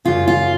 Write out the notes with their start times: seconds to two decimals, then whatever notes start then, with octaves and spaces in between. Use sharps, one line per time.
0.05 F#2 C#3 F4
0.28 F4